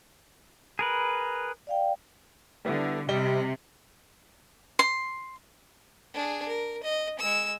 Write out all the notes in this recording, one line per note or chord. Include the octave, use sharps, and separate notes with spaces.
G#4 A#4 B4
D5 F5 G5
D3 G3 B3 E4
C3 G3 D#5 G7
C6
D4 G#4
A#4
D#5
G#3 E6